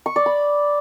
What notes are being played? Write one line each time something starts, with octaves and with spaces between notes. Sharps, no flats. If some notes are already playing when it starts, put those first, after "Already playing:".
C#6
D5
B5